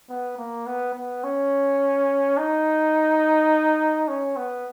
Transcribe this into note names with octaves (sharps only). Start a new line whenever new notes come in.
B3
A#3
B3
B3
C#4
D#4
C#4
B3